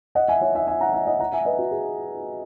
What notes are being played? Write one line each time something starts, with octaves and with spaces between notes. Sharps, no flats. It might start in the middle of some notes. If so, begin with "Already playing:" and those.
D#5 F#5
E5 G#5
C#5 E5
E5 G#5
E5 G#5
F#5 A#5
E5 G#5
D#5 F#5
F#5 A#5
E5 G#5
B4 D#5
F#4
G#4